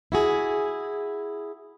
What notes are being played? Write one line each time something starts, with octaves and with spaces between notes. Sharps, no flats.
E4 F#4 G#4